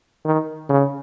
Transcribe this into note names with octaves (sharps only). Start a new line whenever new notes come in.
D#3
C#3